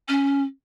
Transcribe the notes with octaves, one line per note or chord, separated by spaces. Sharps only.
C#4